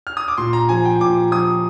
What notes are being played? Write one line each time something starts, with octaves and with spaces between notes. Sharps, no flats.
F6
D#6
D6
A#2 C6
A#5
F3 G#5
G5
A#2 D6
F3 D#6